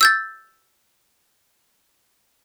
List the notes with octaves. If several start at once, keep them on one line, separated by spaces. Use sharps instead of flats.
E6 G6 A6